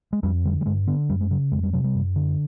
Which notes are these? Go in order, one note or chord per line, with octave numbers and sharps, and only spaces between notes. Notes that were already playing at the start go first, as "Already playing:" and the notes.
G#3
F2 G3
D3 G3
G3
G2 G#3
D3 B3
F#2 G3
G#3
C#3 F#3
F2 G#3
G3
C3 F#3
G3
F#2
D3